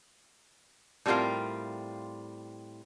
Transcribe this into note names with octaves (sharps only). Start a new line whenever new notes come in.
A2 G3 C4 F4 A#4 F5